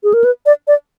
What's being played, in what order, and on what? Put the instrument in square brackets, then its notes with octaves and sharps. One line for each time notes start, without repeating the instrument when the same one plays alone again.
[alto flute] G#4
A#4
B4
D5
D5